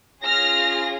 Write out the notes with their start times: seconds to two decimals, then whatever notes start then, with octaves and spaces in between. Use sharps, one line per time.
0.23 C#4 F4 G#4 F6 A#6